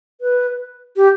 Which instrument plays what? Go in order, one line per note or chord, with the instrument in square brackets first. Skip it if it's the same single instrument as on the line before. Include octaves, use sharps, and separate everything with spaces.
[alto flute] B4
G4